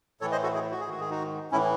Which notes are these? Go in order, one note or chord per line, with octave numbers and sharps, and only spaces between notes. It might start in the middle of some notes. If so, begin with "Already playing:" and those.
A2 E3 A4 C#5
C5 D#5
F#4 A4
E4 G#4
F#4
G#4
G#2 D#3 F#4
G#4
D#4 F#4
A2 E3 C#4 E4